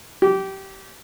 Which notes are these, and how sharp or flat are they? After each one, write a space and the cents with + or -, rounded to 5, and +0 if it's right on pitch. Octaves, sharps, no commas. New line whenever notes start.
G4 -20